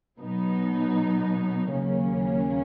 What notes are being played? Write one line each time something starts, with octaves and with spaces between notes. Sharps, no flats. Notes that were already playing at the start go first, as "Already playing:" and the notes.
B2 F#3 B3 D#4
D#2 C#3 F#3 A#3 C#4